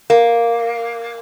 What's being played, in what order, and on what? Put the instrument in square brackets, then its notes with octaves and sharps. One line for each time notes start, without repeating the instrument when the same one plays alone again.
[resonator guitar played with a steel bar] A#3